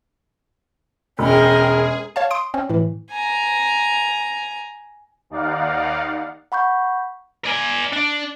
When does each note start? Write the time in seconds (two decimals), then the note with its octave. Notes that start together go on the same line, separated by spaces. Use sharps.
1.19 E1 C#4 G#4 A#4 G5
2.16 C#5 F5 A5
2.31 C6 D#6 D7
2.54 C4 C#4
2.70 A2 E3
3.11 G#5 A#5
5.30 D#2 D#4 D5 F5 F#5
6.52 F#5 B5 C#6 G6
7.45 D5 G#5
7.93 D4